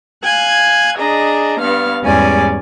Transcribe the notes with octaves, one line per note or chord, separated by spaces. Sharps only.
F5 G#5 F#6 G#6
D4 G#4 D#5 A#5
G2 B3 F5 F6
E2 G#2 G3 C#4 D5 G#5